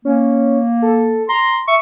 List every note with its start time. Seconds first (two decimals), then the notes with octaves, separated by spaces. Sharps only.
0.05 A#3 C#4
0.82 A4
1.29 A#5 C6
1.68 E5 C#6